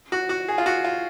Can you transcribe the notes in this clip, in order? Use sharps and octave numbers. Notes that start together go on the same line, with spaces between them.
F#4
F#4
G#4
F4
F#4
F4